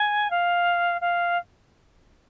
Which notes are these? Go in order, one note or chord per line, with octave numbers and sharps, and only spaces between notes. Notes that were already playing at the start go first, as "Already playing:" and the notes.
Already playing: G#5
F5
F5